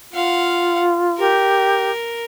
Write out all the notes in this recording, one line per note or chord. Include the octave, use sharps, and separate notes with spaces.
F4 F5 F#5
G4 A#4